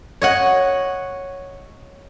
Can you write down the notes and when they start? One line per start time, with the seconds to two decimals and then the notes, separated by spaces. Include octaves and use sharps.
0.22 C#5 D#5 F#5